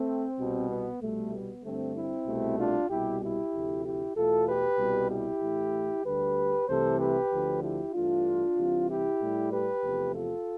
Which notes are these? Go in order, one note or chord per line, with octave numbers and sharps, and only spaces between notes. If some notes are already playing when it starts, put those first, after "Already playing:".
Already playing: A3 C4
C2 B2 G3
B3
C2 B2 G3 A3
B3
G2 D3 G3 A3 C4
C4 E4
C2 B2 A3
D4 F4
C2 B2 G3 E4 G4
E4 G4
D2 C3 F3 A3
E4 G4
E2 B2 A3 F4 A4
G4 B4
C2 B2 G3
E4 G4
A2 E3 A3
D2 D3 G3 G4 B4
C2 C3 E3 A3 A4 C5
G4 B4
D2 D3 F3
E4 G4
G2 E3 A3 D4 F4
C2 C3 E3
E4 G4
A2 G3
G4 B4
E2 C3 F3 A3
F4 A4